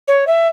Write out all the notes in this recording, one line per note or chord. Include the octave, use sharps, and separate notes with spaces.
C#5
E5